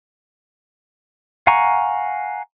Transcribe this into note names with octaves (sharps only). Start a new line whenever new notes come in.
F5 F#5 G#5 A#5 C#6